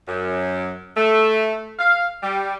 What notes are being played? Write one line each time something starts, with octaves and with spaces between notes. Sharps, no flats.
F#2
A3
F5
G3